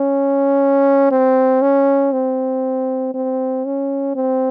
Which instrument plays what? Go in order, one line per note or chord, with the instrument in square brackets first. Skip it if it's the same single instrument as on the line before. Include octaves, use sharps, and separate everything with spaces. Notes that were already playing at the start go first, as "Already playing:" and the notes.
Already playing: [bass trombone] C#4
C4
C#4
C4
C4
C#4
C4